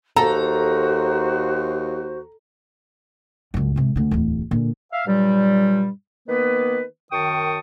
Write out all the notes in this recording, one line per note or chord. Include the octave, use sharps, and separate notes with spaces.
D#2 F#4 A4 C5 A#5
C#2 F#2
G#2 C3
D2 D3
D1 E2
A#2 D3
E5 F5
G2 A#2 F#3 G3
D#3 A#3 B3 B4
F#2 D#3 G5 A5 C#6 D#6